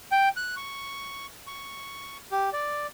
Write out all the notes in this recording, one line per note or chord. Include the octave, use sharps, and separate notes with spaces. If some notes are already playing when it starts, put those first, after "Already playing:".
G5
F#6
C#6
C#6
G4
D5